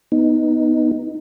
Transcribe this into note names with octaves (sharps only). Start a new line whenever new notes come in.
B3 D#4